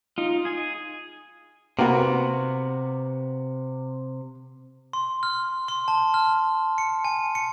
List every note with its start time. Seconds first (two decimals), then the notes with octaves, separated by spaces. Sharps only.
0.18 D#4 F4
0.45 G#4 G#5
1.79 C3 A#3 B3 F#4
4.93 C6
5.23 F6
5.68 C6
5.88 A5
6.14 F6
6.78 C#7
7.04 G#5
7.35 C#7